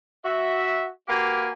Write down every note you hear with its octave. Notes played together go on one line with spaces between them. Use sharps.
F#4 E5
A#3 F#4 G4 B4 F5 G#5